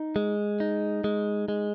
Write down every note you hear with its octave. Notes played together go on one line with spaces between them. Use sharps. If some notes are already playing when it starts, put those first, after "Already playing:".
Already playing: D#4
G#3
D#4
G#3
G#3